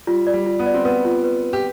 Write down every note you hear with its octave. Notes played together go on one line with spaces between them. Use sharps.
G3 F4
D5
G3
F4
B3
D5
C4
B3 B4
F4
B4
B4
G4